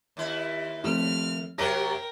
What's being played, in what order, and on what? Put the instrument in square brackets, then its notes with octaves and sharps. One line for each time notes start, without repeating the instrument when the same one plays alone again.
[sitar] D#2 E4
[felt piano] F3 A3 C4 [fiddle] F6
[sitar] C3 F#3 G4 [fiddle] A#4 G5 [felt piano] A#6